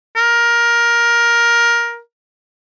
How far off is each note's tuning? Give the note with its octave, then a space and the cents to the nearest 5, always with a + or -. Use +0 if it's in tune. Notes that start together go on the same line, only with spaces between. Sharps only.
A#4 +15